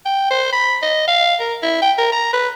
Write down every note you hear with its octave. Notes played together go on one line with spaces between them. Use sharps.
G5
C5
B5
D#5
F5
A#4
E4
G5
A#4
A#5
B4